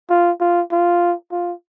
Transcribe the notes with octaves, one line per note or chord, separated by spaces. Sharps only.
F4
F4
F4
F4